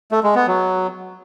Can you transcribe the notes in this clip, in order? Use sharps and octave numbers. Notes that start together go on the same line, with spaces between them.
A3
G#3
B3
F#3